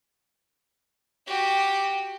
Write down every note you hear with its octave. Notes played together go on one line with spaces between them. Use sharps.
F#4 G4